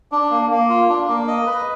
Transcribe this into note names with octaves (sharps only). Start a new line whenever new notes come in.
D4
A#3
A#3
F4
D4
A#3
D#5
B4